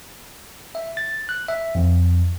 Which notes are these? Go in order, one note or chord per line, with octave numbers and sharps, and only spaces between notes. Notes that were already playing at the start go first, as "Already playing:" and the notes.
E5
A6
F#6
E5
F2